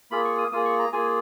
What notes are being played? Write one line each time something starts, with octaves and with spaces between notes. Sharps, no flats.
A#3 F4 G#4 B5
C#6
D#6
A#3 F4 G#4 D#6
C#6
A#5
A#3 F4 G#4 G#5